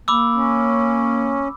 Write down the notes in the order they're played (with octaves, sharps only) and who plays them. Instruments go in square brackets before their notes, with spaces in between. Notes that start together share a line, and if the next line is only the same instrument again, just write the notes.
[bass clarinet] A#3 [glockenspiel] B5 D6 E6
[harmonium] C#4